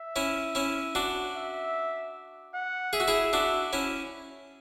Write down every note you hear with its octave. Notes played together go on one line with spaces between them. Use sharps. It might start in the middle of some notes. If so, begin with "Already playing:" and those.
Already playing: E5
C#4 E4
C#4 E4
D4 F#4
E5
F#5
G#4 E5
F#4
E4 G#4
D4 F#4
C#4 E4